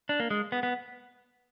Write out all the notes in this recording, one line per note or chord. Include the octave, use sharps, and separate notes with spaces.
D4
A#3
G#3
B3
B3